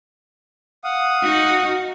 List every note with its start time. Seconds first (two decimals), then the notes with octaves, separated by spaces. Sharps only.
0.84 F5 F#5 D#6
1.22 D#4 F#4